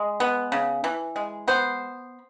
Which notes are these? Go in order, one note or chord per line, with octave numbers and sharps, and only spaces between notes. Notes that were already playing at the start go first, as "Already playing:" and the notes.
Already playing: G#3
B3
C#3
E3
G#3
B3 C5